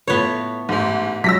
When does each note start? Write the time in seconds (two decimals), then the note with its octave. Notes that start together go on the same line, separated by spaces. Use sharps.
0.07 A2 A3 B3 F4 B4 C#5
0.69 A1 G#2 E3
1.24 F#3 G#3 F#4 E6 A#6 B6